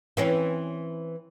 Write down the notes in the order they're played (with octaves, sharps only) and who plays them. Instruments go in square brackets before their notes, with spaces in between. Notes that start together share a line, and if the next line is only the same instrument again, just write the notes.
[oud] E3 C4 C#4